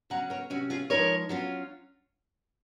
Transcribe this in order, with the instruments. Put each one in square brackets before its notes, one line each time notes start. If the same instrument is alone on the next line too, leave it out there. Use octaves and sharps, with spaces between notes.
[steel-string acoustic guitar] C#3 F#3 C#4 F#5 A#5
A#4 C#5
C3 F#3 C#4 F#4
F4 G#4
F3 G#3 D#4 A#4 C#5
F#3 C#4 F4